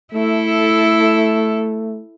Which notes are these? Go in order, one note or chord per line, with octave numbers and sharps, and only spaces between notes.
A3 E4 A4